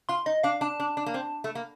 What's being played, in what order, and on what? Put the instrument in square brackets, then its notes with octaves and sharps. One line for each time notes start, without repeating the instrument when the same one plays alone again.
[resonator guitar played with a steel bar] F4 [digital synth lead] C6
[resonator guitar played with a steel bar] D#4 [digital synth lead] D#5
[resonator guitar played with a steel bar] D4 [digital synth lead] F5
[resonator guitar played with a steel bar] D4 [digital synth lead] A5
[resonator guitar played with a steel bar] D4
D4
A#3
C4
A3
A#3